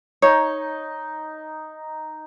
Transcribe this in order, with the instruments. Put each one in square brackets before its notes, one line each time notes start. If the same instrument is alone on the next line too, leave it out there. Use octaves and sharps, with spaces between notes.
[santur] D#4 [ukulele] C#5